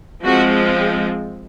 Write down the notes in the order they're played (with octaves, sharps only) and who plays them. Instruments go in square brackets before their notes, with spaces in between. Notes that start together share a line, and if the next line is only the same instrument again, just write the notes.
[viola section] F3 G#3 C4 F#4